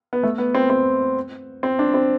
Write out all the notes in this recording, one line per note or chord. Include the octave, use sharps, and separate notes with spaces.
B3
A3
B3
C4
C4
C4
D4
C4